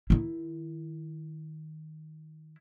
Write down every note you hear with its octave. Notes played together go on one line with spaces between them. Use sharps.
D#3 E4